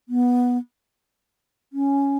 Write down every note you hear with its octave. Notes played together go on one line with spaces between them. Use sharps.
B3
C#4